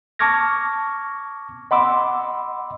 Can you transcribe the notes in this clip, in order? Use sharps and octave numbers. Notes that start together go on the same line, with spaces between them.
A5 C#6 D6 F6 G#6 A#6
D#5 F#5 B5 C6 D6 E6